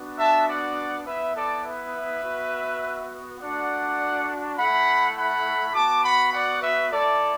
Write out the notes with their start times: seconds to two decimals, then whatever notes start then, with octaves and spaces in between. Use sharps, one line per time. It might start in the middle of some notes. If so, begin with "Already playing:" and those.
Already playing: B3 D4 F#4
0.18 E5 A5
0.47 D5 F#5
1.06 B3 E4 B4 E5
1.35 A4 D5
1.65 B4 E5
2.23 B3 F#4
3.40 A3 D4 F#4 D5 F#5
4.57 A3 E4 F#5 B5
5.16 F#5 B5
5.74 B3 F#4 A5 D6
6.04 F#5 B5
6.33 D5 F#5
6.62 B4 E5
6.91 A3 E4 A4 D5